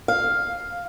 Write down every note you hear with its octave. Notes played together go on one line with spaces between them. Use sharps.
F5